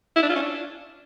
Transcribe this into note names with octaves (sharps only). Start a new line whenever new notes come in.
E4
D4
F4
C#4
D4